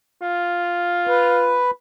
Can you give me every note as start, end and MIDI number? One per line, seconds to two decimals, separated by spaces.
0.22 1.63 65
1.07 1.71 71